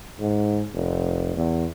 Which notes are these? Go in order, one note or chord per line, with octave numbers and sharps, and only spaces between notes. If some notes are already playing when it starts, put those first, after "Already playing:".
G#2
F1
E2